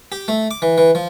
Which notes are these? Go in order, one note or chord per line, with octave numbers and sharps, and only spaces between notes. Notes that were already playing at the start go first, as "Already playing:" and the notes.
G4
A3
D6
E3
E3
F3